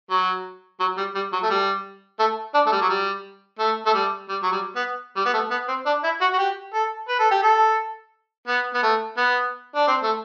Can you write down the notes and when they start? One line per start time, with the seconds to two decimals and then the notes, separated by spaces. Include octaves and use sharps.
0.10 F#3
0.80 F#3
0.97 G3
1.15 G3
1.32 F#3
1.43 A3
1.50 G3
2.19 A3
2.54 D4
2.66 A3
2.72 G3
2.81 F#3
2.89 G3
3.59 A3
3.86 A3
3.94 G3
4.29 G3
4.43 F#3
4.52 G3
4.76 B3
5.16 G3
5.25 B3
5.33 A3
5.51 B3
5.68 C4
5.86 D4
6.04 E4
6.21 F#4
6.33 F#4
6.38 G4
6.74 A4
7.08 B4
7.19 A4
7.31 G4
7.43 A4
8.47 B3
8.74 B3
8.83 A3
9.17 B3
9.75 D4
9.87 C4
10.03 A3